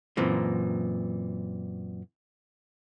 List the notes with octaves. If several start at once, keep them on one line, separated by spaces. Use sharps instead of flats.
F#2 A#2 E3 C4